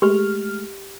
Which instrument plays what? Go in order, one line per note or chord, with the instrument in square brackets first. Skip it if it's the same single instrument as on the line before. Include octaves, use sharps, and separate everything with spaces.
[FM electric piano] G#3 A3 F6 [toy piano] G4